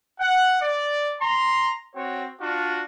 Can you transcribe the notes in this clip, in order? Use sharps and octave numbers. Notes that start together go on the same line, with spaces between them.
F#5
D5
A#5 C6
C4 F#4 C#5
D4 F4 F#4